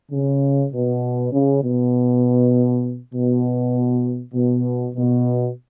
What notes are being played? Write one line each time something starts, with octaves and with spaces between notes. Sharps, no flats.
C#3
B2
C#3
B2
B2
B2
B2